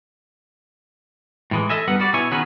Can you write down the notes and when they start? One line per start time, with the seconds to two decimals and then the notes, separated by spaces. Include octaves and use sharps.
1.51 A2 E3 G#3
1.69 A4 D#5 E5 G#5
1.88 G2 G3 B3 A#4 B4 F#5
1.99 G3 F#4 D5
2.13 B2 B3 E4 C#5 G#5
2.31 D#3 B3 C#4 F#4 G#4 B4